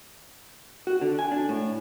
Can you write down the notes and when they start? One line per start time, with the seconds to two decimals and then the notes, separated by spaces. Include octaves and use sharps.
0.87 F#4
1.01 D3
1.19 G#5
1.32 D4
1.49 A2